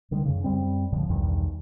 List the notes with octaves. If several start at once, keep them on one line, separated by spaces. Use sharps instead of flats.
D2 D3 D#3 G3
F#2 C#3
F#2 G3 C4
C#2 A2 D3 F3
B1 E2 G2 D#3